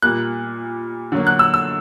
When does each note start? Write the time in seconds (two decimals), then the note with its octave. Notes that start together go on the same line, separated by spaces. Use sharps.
0.02 A#2 G3 A#3 F#6
1.12 D3 F#3 A#3
1.27 F#6
1.39 E6
1.54 E6